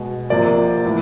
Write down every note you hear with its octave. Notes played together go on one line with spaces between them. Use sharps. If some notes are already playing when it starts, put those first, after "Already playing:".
Already playing: B2 G#3
C3 F3 A#3 D5
A2 E3